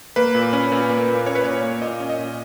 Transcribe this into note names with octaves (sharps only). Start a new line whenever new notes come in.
A#3 B4
A#2
C#4
A#2
A#3
A#2
C#4 C#5
B4
A#2 C#5
A#3
A#2 D#5
C#4
D#5
A#2